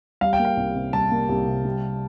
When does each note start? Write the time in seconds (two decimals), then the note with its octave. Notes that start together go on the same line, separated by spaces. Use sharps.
0.21 G3 F5
0.33 G5
0.39 A#3
0.45 F5
0.57 C2
0.75 C3
0.93 G3 A5
1.11 A#3
1.29 C2
1.48 C3
1.65 G3